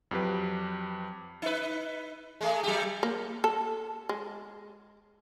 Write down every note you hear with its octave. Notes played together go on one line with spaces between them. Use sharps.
F2 F#3 G4 B4
D#4 B4
G#3 A3 G#4
F#3 G#3 G4
A#3
A4
G#3